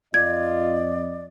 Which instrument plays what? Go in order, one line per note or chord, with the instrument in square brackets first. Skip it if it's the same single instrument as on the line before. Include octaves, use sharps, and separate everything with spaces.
[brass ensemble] F2 D#5 [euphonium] F4 [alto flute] D5 [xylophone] G#6